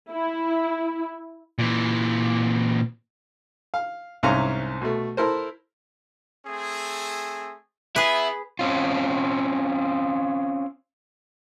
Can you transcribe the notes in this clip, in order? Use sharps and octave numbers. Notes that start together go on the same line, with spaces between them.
E4
A#2 E3
F5
C2 G#2 C#4 F5 A#5
B2 A3
E4 A4 A#4 C5
A3 C4 G#4
B3 E4 G#4 B4
C4 C#4 F4